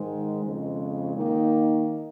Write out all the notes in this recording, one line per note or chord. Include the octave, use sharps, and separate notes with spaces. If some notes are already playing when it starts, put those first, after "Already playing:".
Already playing: G#2 D#3 G#3 D#4
F2 C#3 G#3
D#3 A#3 D#4